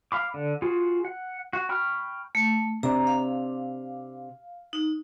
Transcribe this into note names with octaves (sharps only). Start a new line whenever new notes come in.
F5 B5 D6
D3
F4 F#4 G#4
F#5
F#4
G5 B5 C#6 F6
A3
C3 D4 A#5
F5
D#4